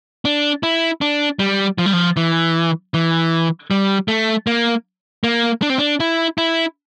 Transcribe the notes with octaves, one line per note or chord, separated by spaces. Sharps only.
D4
E4
D4
G3
F3
G3
F3
E3
E3
G3
A3
A#3
A#3
D4
C4
D4
E4
E4